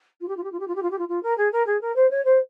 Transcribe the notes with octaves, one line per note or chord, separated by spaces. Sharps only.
F4
G4
F4
G4
F4
G4
F4
G4
F4
G4
F4
F4
A#4
G#4
A#4
G#4
A#4
C5
C#5
C5